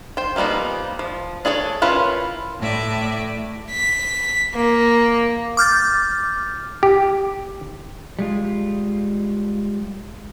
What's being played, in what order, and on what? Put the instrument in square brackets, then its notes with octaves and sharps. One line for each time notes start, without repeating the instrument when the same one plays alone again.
[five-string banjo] C5 G5
F3 G3 A#3 B3 D#4
F3
D4 G#4 A4 C#5
C#4 E4 F4 A#4 B4
[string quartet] A2 D5 E5
[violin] B6
A#3
[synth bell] D6 F6 G6 A6
[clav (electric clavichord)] G4
[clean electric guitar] G3 G#3 F4